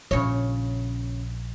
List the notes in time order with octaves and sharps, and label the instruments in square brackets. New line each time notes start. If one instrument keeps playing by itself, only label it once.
[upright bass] A#1 [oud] C#3 C#5